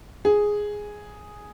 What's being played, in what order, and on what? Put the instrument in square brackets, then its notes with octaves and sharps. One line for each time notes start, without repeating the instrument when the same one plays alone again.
[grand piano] G#4